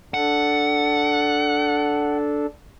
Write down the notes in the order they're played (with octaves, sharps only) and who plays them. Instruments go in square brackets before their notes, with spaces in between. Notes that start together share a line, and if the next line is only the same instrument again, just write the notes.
[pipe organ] D4 A4 [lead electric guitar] F#5